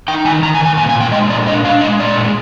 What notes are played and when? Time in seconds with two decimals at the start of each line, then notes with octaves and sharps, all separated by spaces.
0.08 D#4 G5
0.25 D#3 G#5
0.43 D#3 A#5
0.55 G#5
0.60 D#3
0.66 G#5
0.77 A#2 G#5
0.89 G#5
0.95 A#2
1.00 G5
1.12 G#3 D#5
1.30 A#2 D5
1.46 D4 D#5
1.64 D4 F5
1.81 G#3 D#5
2.00 A#2 D5
2.16 G#3